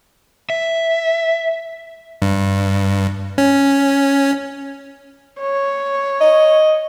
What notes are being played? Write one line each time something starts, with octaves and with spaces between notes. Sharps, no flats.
E5
G2
C#4
C#5
D#5